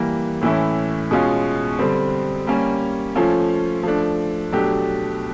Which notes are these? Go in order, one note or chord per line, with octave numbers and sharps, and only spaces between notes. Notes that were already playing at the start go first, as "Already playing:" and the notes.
Already playing: E3 G3 A#3
A2 E3 A3 C#4 E4
B2 G#3 C#4 F4
D3 G3 C4
G3 A#3 C#4
F3 A3 C#4 F4
F3 A3 D4
B2 F#3 A3 D4 G4